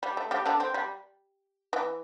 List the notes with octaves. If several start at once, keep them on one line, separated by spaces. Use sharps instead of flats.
G3
A3
G3 G4
D3 D4
C4
G3
E3